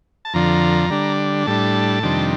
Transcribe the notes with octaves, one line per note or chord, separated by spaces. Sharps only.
A5
F2 D3 F3 A#5
D3 G3 D4
A2 G3 D4 A5
F2 C3 D#3 G3 D4